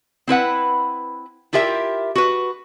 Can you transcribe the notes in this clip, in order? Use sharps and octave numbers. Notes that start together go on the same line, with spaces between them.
C4 E4 B4 F#5
E4 F4 G4 A#4 E5
F#4 B4